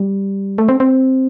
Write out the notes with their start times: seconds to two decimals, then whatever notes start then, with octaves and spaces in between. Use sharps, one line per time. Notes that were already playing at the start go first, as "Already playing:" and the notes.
Already playing: G3
0.58 A3
0.69 C4
0.80 C4